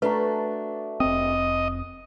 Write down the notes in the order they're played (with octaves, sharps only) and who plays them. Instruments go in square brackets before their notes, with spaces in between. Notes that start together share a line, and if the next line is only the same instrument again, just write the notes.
[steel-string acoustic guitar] A3 D4 F#4 [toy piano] B4 A#5
[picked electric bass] F1 C4 [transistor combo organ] D#5